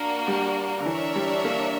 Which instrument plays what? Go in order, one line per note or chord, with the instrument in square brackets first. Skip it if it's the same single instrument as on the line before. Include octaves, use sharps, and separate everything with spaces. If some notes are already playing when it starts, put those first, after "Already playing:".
Already playing: [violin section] A#3 D4 F#4
[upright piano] G3
D3
[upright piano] E3 [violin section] D4 A#4 C#5 E5
[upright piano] G3
A#3